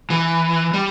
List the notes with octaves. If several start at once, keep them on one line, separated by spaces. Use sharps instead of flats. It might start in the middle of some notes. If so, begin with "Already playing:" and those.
E3
G3